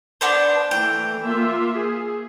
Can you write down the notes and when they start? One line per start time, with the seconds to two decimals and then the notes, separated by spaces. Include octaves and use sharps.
0.21 B3 D4 C5
0.71 E3 A3 G5
1.22 A#3 F4 E5
1.76 G#4